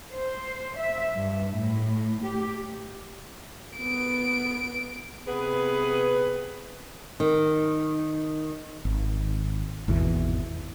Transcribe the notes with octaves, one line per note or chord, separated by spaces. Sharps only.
C5
E5
G2
A2
G4
B3 D7
C3 B3 G#4 B4
D#3
G#1
G#1 E2 B2 E3